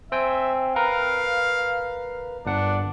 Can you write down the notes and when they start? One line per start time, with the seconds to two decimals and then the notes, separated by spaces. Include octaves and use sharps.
0.12 C4 E5 G5 G#5
0.76 A#4 B4 F5 A#5
2.46 G1 D4 F#5